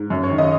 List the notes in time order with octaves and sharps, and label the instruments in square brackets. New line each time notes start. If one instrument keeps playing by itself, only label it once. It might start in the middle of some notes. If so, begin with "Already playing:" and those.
Already playing: [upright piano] G#2
F#2
C#5
D#3
D#5